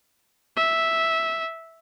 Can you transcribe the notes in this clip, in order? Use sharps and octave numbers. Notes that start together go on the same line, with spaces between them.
E5